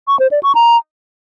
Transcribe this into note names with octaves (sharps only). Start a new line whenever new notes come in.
C#6
C5
D5
C#6
A#5